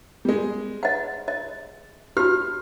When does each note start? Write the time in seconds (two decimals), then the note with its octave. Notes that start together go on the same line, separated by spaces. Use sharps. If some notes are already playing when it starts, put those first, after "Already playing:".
0.25 G3 G#3
0.83 D#5 F#5
1.28 D#5
2.17 F#4 G4 F6